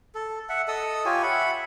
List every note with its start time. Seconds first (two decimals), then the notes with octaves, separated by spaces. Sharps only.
0.15 A4
0.49 E5 F#5
0.68 A4 D#5 D#6 E6
1.06 F4 G4 C#5 G#5
1.22 E5 F#5 B5